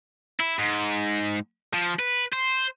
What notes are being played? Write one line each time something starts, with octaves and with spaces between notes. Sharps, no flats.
E4
G#2
F3
B4
C5